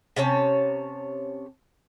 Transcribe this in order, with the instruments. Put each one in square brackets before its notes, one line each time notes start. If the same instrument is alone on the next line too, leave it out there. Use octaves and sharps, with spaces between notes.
[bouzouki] C3 C#4 C#5 A5